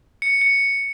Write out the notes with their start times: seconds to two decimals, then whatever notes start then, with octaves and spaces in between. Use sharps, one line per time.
0.22 C#7
0.41 C#7